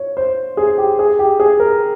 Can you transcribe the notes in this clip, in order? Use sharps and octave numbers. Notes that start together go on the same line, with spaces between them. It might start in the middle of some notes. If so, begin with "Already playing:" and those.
Already playing: C#5
C5
G#4
G4
G#4
G4
G#4
A#4